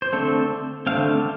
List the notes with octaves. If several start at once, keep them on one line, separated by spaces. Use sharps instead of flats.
C5
D3 A3 C4 A4
D3 A3 C4 F5